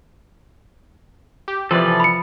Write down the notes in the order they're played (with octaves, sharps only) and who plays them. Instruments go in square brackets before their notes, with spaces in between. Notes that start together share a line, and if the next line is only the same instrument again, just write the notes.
[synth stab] G4
[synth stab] C3 E3 [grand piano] F3 [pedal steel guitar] A4 B4 D5
[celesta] B5 C#7